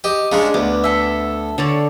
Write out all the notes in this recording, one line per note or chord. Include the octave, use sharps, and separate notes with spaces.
G4 D#5
C#3 G#3 D4 F#5 A#5
D2 B3 D6
A4 E5
D3 A4 C#5 D5